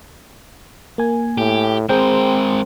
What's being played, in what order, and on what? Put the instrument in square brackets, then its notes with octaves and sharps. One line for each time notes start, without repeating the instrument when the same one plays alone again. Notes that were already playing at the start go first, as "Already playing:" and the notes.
[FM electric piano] A#3 G#5
[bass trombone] A2 [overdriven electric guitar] G4
[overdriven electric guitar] G#3 A#4 [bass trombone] C4 [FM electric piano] G#4 C5 G5